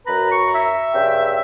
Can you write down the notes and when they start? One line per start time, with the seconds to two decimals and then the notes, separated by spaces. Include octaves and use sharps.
0.07 F#2 B4 A#5
0.31 C#6
0.55 E5
0.92 G2 C#3 G5